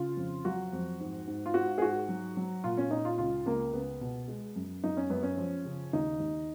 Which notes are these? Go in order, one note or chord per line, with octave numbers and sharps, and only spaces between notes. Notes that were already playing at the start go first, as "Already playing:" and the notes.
Already playing: C#3 F4
F2
F#3 F#4
F2
G#2
G#2
F4
G#2 F#4
G#4
G#2 F#4
F#3
F#3
A#2 F4
C#4
A#2 D#4
F4
C#2 F4
C#2 A#3
C#2 B3
B2
G#3
F#2
F#2 D#4
C#4
F#2 B3
C#4
F3
C#3
D#2 D#4
D#2